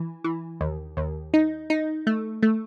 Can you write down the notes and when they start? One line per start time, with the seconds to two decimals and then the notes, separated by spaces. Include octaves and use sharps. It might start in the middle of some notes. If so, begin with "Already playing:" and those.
Already playing: E3
0.24 E3
0.61 D#2
0.97 D#2
1.34 D#4
1.70 D#4
2.07 A3
2.43 A3